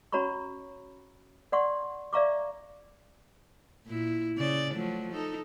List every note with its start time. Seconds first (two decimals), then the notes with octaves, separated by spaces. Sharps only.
0.12 C#4 F#4 C#5 A#5 B5 C#6
1.52 D5 F#5 C6 C#6
2.13 D5 E5 F5 A#5 C#6 D6
3.86 A#2 E4
4.37 C#3 D5
4.74 F3 F#3 A3
5.13 D#4 A4